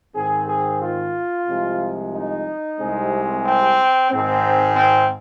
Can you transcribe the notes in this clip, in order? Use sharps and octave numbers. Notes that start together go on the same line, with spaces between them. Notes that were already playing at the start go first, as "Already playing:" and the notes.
G#2 D#3 C4 G#4
G#4
F4
C2 C3 F3 G#3
D#4
C2 C3 G#3 C4
C4
G#1 G#2 G#3 C4
C4